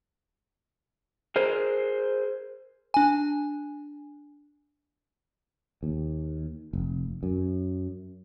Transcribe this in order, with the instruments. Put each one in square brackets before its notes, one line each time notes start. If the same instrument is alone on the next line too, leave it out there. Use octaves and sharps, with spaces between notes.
[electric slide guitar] G#4 A#4 C5
[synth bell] D4 G#5
[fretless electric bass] D#2
F1
F#2